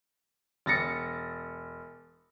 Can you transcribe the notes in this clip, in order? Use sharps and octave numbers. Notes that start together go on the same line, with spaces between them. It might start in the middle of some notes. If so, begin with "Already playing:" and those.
E1 A6 A#6 C#7